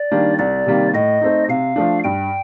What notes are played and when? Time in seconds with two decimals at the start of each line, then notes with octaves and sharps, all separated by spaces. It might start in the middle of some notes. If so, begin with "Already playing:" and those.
Already playing: D5
0.12 D#3 G3 A#3 D4
0.39 C2 D5
0.66 C3 D#3 G3 A#3
0.94 A2 D#5
1.21 A3 C4 D#4
1.48 C3 F5
1.76 F3 A3 D4
2.04 G2 G5